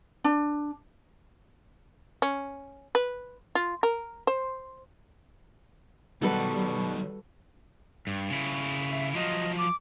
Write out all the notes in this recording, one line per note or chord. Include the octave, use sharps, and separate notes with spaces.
D4
C#4
B4
F4
A#4
C5
B2 D#3 F#3 G3 F#4 A4 B4
G2
C#3 E4
E5
F3 F#3 D#5
D6